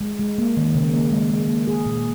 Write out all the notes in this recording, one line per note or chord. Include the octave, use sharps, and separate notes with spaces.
G#3
G#3
A#3
D#3
C#3
A#3
G#3
G#3
A#3
G#4
A#2